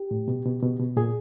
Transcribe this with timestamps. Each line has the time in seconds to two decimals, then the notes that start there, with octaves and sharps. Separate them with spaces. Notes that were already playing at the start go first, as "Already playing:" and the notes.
Already playing: G4
0.11 A2
0.28 B2
0.45 B2
0.63 B2
0.80 B2
0.97 A#2 G#4